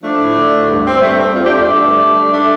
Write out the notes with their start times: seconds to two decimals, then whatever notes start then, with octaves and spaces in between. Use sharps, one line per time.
0.03 F3 A3 D4
0.20 A2
0.36 D3
0.53 D2
0.69 G2
0.85 G2 C4
1.02 G2 A3
1.18 G3 C4
1.34 F2 C4 F4
1.45 D4 G4
1.51 F2
1.56 A3 D4
1.67 D3
1.83 G2
2.00 G3
2.16 G3
2.32 G3 A3 D4